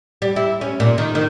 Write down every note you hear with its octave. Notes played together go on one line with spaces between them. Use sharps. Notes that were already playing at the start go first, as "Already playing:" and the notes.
G3
E4
C#4
A#2
D#3
D#3